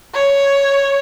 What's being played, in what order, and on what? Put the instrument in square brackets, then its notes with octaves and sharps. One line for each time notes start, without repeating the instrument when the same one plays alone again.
[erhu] C#5